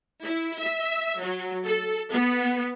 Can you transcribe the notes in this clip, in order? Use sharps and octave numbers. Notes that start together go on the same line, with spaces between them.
E4
E5
F#3
A4
B3